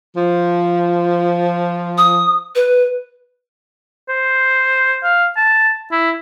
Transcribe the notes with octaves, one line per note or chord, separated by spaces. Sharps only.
F3
D#6
B4
C5
F5
A5
E4